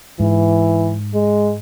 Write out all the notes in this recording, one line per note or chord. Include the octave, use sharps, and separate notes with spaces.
G#2 E3
G#3